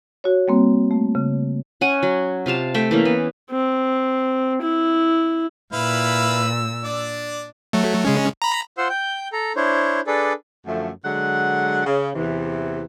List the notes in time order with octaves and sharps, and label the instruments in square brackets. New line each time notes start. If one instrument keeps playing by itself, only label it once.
[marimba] F#4 C#5
G3 A#3 C4
A3
C#3
[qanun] C#4 F#5 G#5
F#3
C3 F4 F5 A5
A3 E5 G5
E3 A#3 C#4
B3
[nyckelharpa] C4
E4
[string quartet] A#2 E6 [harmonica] E4 B4 F5
[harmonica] D4 D5
[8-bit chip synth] F#3 A3
C#3 G#3 C#4
A#5 B5
[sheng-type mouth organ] F4 C5 F#5 C6 E6
G5 G6
A4 A#5
D4 E4 C5 C#5
D4 G#4 A4 B4 D5
[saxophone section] F#2 D3 F3 A3
D3 F#3 G#3 F#5
C#3
E2 C3 E3